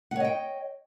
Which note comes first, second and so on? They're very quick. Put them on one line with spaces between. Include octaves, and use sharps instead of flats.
F#5 C#5 D#5 G5